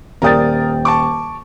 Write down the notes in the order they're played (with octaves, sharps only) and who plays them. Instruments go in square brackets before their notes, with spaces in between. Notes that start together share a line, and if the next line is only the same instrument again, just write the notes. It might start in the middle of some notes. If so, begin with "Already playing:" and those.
[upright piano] D#1 G5 A6 [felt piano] A#4 D5 D#6
[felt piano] A5 C#6 D6